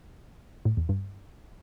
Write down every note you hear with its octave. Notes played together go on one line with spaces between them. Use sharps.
A2
E2
G2